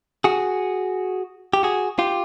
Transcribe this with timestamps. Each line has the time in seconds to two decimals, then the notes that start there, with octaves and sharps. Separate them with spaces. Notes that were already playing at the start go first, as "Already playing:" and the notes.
0.24 F#4 G#4
1.53 G4
1.63 F#4 G#4
1.99 F4 G4